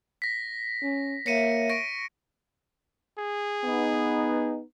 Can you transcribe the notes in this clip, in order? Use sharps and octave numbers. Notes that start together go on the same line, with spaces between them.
A#6 B6
C#4
A#3 C#5 E5 A#6 C#7 D#7
C#6 A#6 D7
G#4
B3 D#4